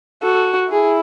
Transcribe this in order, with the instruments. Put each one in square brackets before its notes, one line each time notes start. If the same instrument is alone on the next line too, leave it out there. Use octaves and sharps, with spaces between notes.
[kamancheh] F#4 [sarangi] A4
[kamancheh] E4 [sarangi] G#4